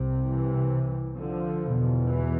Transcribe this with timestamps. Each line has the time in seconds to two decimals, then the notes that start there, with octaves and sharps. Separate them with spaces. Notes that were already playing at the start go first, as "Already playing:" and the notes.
Already playing: C2 C3
0.25 E3
1.16 D3 F3
1.63 E2 B2
2.08 E3